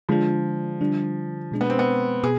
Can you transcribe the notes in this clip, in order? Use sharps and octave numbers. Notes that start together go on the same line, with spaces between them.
D3 F3 G#3 D4 F4
D3 G3 D4
B2 G#3 D4
B3
C4
B3
B2 B3 G#4